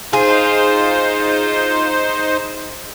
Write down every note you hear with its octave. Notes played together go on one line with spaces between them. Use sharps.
D#4 F4 G#4 C5